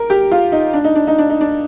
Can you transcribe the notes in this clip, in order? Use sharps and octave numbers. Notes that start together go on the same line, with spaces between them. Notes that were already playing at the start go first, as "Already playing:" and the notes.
Already playing: A#4
G4
F4
D#4
D4
D#4
D4
D#4
D4
D#4
D4